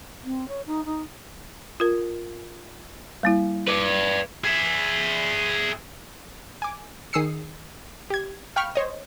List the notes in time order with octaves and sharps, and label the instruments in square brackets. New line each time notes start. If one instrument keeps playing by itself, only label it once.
[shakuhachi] C4
C#5
D#4
D#4
[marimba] F4 A#4
G3 A#3 E4
[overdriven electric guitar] B4 D5
[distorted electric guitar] G#4 E5
[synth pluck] G#5 D6
D#3 G#4 D#6 E6 C7 C#7
G4 G#6
F5 G5 B5 C#6 F6
C5 C#5 D#5